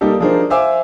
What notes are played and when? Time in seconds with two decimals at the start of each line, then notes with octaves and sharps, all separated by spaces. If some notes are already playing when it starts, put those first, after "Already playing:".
0.01 G3 A#3 D#4 G4 A4
0.20 F3 D4 D#4 G#4 A#4 C5
0.50 C5 E5 F5 G#5 D6 E6